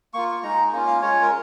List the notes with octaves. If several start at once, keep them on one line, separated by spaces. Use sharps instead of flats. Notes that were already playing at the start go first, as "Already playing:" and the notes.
A#3 F4 C#6
C#6
G#3 D#4 A#5
A#3 C#4 F4
F5
G#3 C#4 F4 C#5
A#4